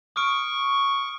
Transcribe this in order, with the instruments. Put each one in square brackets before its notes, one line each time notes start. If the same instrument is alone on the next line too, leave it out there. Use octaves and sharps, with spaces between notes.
[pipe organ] C#6 [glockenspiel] D#6 F6 D7